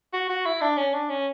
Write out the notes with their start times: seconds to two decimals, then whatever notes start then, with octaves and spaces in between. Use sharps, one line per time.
0.13 F#4
0.29 F#4
0.46 E4
0.61 D4
0.77 C#4
0.94 D4
1.10 C#4